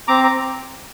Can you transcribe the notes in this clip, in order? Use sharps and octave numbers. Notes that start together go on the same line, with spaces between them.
C4 A#5 D6
A#5 D6
C4